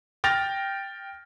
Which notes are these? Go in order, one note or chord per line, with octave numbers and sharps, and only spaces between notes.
G5 F6 G6 A6 A#6 F7